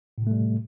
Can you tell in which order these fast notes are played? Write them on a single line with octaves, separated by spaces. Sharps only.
A2 C3 A3 G3